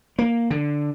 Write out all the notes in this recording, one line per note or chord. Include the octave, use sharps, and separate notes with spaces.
A#3
D3